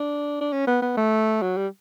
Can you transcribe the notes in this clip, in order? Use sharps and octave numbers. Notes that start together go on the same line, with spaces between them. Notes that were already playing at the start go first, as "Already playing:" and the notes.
Already playing: D4
D4
C#4
B3
B3
A3
F#3
G3